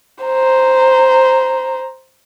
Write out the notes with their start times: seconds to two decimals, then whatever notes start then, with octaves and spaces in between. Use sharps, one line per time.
0.23 C5 A#5